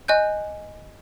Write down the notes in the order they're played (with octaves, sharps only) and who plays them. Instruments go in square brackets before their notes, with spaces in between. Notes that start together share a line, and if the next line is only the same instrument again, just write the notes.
[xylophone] D#5 G#5 F#6 G6